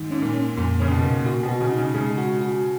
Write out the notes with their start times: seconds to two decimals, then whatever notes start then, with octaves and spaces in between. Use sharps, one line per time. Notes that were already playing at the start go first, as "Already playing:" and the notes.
Already playing: G#2 D#3
0.11 G#2 C#4
0.22 A#2
0.34 C#4
0.57 F2 A#2
0.80 C#3 C#4
0.91 B2
1.03 A#3
1.26 A#2 F#4
1.43 B2
1.48 F#4
1.61 C#3
1.72 D#4
1.78 C#3
1.94 C#3 G#3
2.18 F#4
2.41 F#4